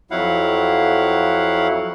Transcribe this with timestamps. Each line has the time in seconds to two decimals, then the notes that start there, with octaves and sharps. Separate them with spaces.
0.11 F2 F#3 E4 F5 F#5